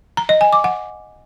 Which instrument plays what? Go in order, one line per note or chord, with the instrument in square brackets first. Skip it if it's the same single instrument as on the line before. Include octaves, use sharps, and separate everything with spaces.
[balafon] A#5
D#5
G#5
D6
F#5